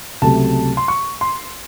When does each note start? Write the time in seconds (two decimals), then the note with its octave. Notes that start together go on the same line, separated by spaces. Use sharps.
0.22 C#2 C3 F#3 A3 A5
0.77 C6
0.88 C#6
1.21 C6